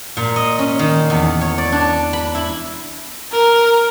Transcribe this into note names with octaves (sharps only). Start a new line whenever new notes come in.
A#2
D#5
C#4
D#3
E2
C#5
D5
D4
B5
E4
A#4